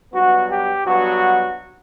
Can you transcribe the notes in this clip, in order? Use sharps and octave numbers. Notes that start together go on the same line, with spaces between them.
G2 F#3 B3 F#4
G4
G2 F#3 B3 F#4